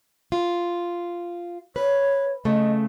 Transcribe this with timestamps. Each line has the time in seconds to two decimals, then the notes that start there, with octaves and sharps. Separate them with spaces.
0.32 F4
1.76 B4 C#5
2.45 C#3 A3 D#5